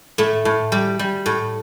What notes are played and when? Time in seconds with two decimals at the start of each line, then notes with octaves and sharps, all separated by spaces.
0.18 A2 A3
0.45 A2
0.72 G3
0.99 G3
1.26 A2